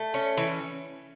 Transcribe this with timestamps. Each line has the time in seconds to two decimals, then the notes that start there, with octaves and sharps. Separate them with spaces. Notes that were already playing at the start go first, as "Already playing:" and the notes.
Already playing: A3
0.14 C#4
0.37 E3